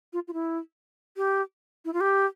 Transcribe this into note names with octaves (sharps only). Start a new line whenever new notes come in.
F4
F4
E4
G4
E4
F4
G4